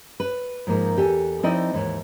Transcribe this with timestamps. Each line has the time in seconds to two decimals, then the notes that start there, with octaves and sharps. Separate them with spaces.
0.20 B4
0.67 G#2 F3 A#3 D#4 F4
0.97 E2 G4 A4 G#5
1.43 F3 C4 D#4 E4 D5 D#5
1.73 D#2 G#2 E3